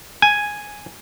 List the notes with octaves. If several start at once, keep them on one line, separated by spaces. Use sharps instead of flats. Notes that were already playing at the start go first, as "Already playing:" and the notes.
G#5